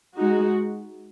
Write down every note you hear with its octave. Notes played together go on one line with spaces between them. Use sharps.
G#3 D#4 F#4